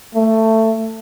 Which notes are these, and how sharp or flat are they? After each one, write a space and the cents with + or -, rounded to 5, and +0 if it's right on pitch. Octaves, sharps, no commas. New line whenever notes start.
A3 +15